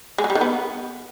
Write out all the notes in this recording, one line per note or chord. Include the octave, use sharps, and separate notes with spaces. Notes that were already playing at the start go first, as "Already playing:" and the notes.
G#3
F#3
G3
D#3
B3